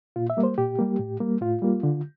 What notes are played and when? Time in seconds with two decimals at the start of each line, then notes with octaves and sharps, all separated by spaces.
0.16 A#2 F4
0.30 E5
0.37 G3 A#3
0.43 C5
0.58 A#2 G4
0.79 G3 A#3
0.99 A2
1.20 G3 A#3
1.41 A2 F4
1.62 G3 A#3
1.83 D3